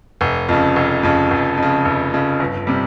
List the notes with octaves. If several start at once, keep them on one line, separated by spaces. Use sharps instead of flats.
F1
F2 C#3
F1
F2 C#3
F1
F2
C#3
F1
F2 C#3
G1
C3 G3